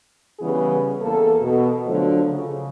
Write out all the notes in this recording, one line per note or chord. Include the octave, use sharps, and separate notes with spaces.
C#3 E3 G3 B3 G#4
E2 A#3 A4
B2
D3 F3 F#3 A3
C#3